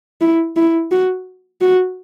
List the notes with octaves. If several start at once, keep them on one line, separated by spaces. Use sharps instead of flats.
E4
E4
F#4
F#4